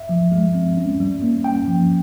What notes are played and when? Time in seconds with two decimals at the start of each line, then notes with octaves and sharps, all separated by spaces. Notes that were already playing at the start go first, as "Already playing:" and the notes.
Already playing: E5
0.09 F3
0.32 G#3
0.54 C4
0.77 C#4
1.00 G3
1.22 A#3
1.44 C#4 G5
1.67 F3